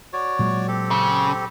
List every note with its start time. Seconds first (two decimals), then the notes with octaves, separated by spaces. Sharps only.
0.13 F#4 C#5 D5
0.39 A#2 F#3 G#3
0.68 C4 G4 A4
0.91 C#3